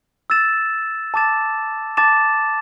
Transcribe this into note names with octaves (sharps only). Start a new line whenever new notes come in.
E6 A6 E7
A5 D6 A6 E7
A5 D6 A6 E7